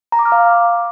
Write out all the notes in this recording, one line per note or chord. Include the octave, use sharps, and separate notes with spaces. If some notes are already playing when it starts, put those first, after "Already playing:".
A#5
D6
F6
F5